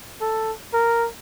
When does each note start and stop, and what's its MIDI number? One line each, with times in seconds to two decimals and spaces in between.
0.21 0.53 69
0.74 1.08 70